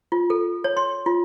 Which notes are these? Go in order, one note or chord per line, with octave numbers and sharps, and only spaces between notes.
F4
A4
C#5
C6
F4